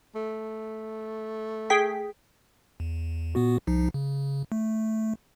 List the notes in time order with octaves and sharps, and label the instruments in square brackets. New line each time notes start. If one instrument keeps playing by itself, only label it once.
[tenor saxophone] A3
[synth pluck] G#4 G5 B6
[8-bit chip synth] E2
A#2 B3 F#4
C2 F3 D#4
C#3
A3